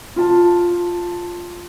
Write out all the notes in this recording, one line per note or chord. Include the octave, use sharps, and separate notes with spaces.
F4 A5